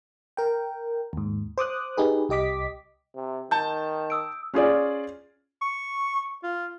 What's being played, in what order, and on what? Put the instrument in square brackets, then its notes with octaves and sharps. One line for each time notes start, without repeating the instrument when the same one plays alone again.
[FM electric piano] A#4 G5
D#2 G#2
C5 D6 D#6 F#6
D#4 G4 G#4 B4
C2 G4 D#5 D6 B6
[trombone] C3
[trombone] D#3 [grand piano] A5 G6
[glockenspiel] D#6 E6 D7
[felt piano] C#4 F4 G#4 D5
[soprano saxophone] C#6
F4